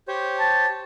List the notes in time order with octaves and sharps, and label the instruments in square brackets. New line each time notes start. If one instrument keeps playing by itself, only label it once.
[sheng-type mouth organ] G4 C5 C#5
[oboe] A5